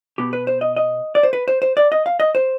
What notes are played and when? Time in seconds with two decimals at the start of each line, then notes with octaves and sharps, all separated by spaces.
0.18 B2 B3 G4
0.33 B4
0.47 C5
0.61 D#5
0.77 D#5
1.15 D5
1.23 C5
1.33 B4
1.48 C5
1.62 C5
1.77 D5
1.92 D#5
2.06 F5
2.20 D#5
2.35 C5